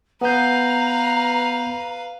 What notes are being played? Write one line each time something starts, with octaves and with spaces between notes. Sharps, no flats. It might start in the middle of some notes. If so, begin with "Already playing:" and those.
B3 B4 F5 A#5 G6